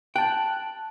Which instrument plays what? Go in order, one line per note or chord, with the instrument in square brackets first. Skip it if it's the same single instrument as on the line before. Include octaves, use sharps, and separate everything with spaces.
[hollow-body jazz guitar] G5 [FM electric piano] A5 F#6